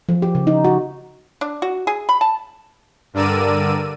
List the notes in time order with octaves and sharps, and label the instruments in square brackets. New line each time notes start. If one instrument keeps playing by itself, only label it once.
[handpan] F3
G4
C#3
D#4
F#4
[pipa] D4
F#4
G#4
B5
A5
[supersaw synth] G2 D3 A#4 D5 E6 D#7